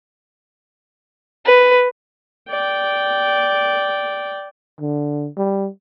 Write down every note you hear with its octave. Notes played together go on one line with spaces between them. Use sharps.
B4
D5 G5
D3
G3